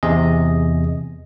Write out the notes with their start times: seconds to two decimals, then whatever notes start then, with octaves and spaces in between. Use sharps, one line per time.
0.03 E2 C3 G#4 D#5